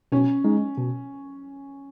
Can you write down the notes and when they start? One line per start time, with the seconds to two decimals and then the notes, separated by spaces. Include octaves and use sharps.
0.12 B2 C#4
0.44 G#3 D#4
0.77 B2